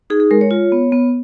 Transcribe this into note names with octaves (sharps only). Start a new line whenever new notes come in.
D#4 G#4
G#4
G#3 A#4
C#5
F4
B3
B3